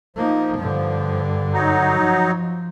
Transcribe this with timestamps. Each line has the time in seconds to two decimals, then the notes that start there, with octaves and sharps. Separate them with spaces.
0.16 F3 A#3 D#4
0.58 G2 D3
1.53 F#3 D#4
1.99 F3